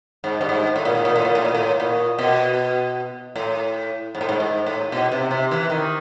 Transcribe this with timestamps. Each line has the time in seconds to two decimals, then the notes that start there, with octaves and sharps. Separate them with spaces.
0.24 G#2
0.41 G2
0.49 G#2
0.76 A2
0.85 A#2
0.95 A2
1.05 A#2
1.16 A2
1.25 A#2
1.35 A2
1.45 A#2
1.55 A2
1.80 A#2
2.19 B2
3.36 A2
4.15 G#2
4.21 A2
4.29 G#2
4.40 G#2
4.66 A2
4.92 B2
5.12 C3
5.31 C3
5.51 E3
5.70 D#3